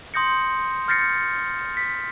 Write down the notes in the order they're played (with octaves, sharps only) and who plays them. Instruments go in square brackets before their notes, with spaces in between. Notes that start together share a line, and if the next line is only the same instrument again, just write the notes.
[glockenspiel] C6 D#6 G6 A#6 C#7
F6 G6 A6 A#6 C7 C#7
B6